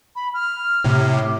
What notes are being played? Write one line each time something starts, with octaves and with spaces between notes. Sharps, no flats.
B5
F6
A2 C3
D6